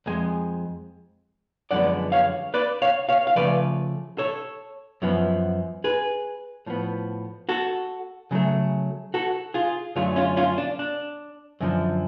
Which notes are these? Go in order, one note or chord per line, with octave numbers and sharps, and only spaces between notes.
F2 F3 G#3 G#5
F#2 D3 F3 G#3 B3 D5 F#5
C#5 F5
B4 D5
C#5 F5
C#5 F5
F5
C#3 F3 A3 B4 D5
A4 C#5
F#2 F3 B3
G#4 B4
A2 F3 B3
F#4 A4
C#3 F#3 A3
F#4 A4
F4 G#4
F#2 D3 F#3 A3 F4 G#4
C#4 F4
C#4 F4
D4
D4
F#2 D3 F3